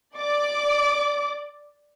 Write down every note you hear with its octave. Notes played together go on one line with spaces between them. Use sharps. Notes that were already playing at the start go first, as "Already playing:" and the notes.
D5 D6